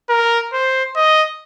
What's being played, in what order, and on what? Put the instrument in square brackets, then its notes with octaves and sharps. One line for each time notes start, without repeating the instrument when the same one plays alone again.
[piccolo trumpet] A#4
C5
D#5